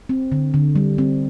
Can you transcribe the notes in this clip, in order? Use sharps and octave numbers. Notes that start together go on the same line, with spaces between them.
C4
D3
D3
G3
C4